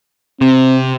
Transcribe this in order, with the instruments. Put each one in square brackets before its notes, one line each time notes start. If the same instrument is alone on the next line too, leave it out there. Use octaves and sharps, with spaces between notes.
[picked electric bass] C3 [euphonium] C4